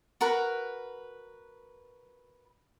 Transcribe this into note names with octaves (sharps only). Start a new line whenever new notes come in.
F#4 A#4 B4